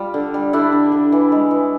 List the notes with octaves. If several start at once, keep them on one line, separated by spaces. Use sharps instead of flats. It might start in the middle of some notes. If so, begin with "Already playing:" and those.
Already playing: G3 F4
D3
G3
D3 D4 E4
D3
D3
E3
G#3
E3